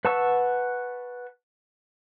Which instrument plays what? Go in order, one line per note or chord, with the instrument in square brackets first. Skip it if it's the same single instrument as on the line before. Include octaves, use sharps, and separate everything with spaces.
[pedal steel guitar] B4 F#5 A5 C#6 E6